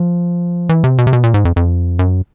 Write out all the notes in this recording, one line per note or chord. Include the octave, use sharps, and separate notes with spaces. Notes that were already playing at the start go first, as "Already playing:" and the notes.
Already playing: F3
E3
C3
B2
C3
B2
A#2
G#2
F2
F2
F#2